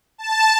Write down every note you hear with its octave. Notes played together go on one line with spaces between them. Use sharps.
A5